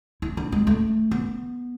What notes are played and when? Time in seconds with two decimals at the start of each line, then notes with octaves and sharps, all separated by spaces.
0.22 E4
0.37 D4
0.52 G#3
0.67 A3
1.11 B3